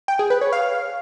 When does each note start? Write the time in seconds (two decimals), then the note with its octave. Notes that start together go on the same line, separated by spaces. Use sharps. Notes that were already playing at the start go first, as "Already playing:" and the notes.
0.08 G5
0.19 G#4
0.30 B4
0.41 C#5
0.53 F5